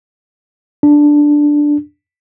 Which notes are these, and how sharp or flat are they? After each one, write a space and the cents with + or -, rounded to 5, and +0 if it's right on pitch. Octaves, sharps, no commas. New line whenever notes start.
D4 +0